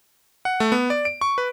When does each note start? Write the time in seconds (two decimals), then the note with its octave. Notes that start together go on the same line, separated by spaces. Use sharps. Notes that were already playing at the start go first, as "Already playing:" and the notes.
0.45 F#5
0.60 A3
0.72 B3
0.90 D5
1.05 D7
1.21 C#6
1.38 B4